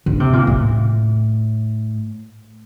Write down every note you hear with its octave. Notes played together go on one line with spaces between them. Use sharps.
D3
C3
A#2
A2